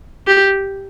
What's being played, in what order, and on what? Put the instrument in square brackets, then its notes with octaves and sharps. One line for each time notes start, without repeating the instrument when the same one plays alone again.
[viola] G4